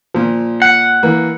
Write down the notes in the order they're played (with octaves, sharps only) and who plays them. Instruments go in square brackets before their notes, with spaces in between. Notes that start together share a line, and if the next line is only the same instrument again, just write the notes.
[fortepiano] A#2 F3
[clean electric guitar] F#5
[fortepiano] E3 A#3